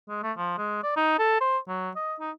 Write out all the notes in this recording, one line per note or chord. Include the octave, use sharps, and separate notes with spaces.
G#3
A3
F3
G#3
D5
D#4
A4
C5
F#3
D#5
D#4